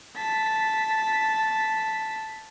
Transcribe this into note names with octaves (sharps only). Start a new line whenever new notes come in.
A5 B6